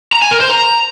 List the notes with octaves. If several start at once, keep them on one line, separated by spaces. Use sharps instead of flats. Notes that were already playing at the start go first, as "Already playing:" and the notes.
A#5
G#5
A#4
C5
A#5